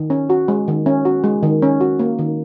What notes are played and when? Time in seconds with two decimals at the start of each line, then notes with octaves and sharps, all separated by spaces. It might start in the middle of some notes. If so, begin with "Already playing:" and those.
Already playing: D#3
0.10 C#4
0.30 F#4
0.48 G#3
0.68 D#3
0.86 C#4
1.05 F#4
1.24 G#3
1.43 D#3
1.62 C#4
1.81 F#4
1.99 A#3
2.19 D#3